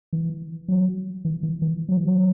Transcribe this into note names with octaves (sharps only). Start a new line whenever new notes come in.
E3
F#3
E3
E3
E3
F#3
E3
F#3